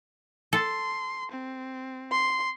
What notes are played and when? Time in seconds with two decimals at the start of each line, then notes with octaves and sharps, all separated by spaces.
0.53 A4 C6
1.31 C4
2.12 C6